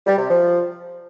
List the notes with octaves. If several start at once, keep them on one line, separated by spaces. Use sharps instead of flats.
G3
C3
F3